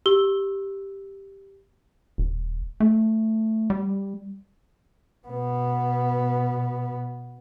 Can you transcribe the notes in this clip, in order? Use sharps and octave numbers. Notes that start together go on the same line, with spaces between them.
G4 E6 G7
D#1
A3
G3
B2 B3